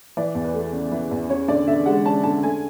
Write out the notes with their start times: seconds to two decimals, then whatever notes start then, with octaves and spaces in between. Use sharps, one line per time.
0.17 E3 D5
0.35 E2
0.44 B4
0.54 A3
0.72 C#3
0.92 E3
1.11 E2
1.30 C#4 C#5
1.48 D3 D5
1.67 D3 E5
1.86 G#3 F#5
2.05 C#4 A5
2.23 D3 A5
2.43 A3 G#5